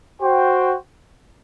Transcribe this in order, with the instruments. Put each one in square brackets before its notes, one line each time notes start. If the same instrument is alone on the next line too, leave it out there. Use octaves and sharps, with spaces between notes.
[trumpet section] F#4 C5 G5